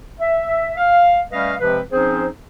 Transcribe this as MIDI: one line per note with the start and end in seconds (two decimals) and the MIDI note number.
0.20 0.71 76
0.76 1.20 77
1.31 1.54 55
1.31 1.54 57
1.31 1.54 61
1.31 1.54 71
1.31 1.54 75
1.31 1.54 77
1.59 1.80 48
1.59 1.80 53
1.59 1.80 56
1.59 1.80 60
1.59 1.80 71
1.92 2.27 53
1.92 2.27 60
1.92 2.27 61
1.92 2.27 63
1.92 2.27 68
1.92 2.27 72